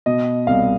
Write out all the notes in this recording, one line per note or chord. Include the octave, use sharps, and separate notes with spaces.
B2 D#5
C2 F5